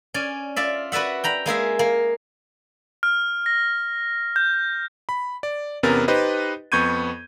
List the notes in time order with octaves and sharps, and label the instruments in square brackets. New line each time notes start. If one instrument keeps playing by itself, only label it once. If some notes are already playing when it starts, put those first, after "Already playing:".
[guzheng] C#4 D5 G#5
F4 D5 E5
F#4 B4 D5 E5 F#5
G5 A#5 B5
G#3 A#3 G#4 E5
A#3
[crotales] F6
A#6
G6
[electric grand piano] B5
D5
E2 C3 B3 C#4 A#4 A6
D#4 G4 B4 C5 D#5
F2 B3 C#6 G6 G#6 D#7